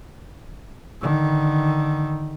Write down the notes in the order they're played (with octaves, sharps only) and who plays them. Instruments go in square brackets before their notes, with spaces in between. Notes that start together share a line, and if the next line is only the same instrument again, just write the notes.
[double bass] D3 D#3